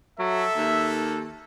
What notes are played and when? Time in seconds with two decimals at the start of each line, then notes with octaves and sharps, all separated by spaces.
0.19 F#3 A4 E5
0.57 D#2